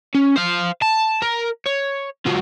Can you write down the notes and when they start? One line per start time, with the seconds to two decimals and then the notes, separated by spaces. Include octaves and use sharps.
0.15 C#4
0.36 C5 F5
0.82 A5
1.22 A#4
1.66 C#5
2.26 F#3 F4